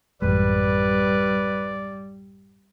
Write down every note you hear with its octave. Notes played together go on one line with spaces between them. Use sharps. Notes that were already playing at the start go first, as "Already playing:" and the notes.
A1 F#2 G3 G#3 B4 D5